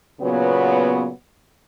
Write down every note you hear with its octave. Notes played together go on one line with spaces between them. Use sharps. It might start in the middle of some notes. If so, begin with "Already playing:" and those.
A#2 C#3 F#3 B3